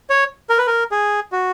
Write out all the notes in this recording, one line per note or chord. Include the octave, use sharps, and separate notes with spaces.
C#5
A#4
B4
A#4
G#4
F#4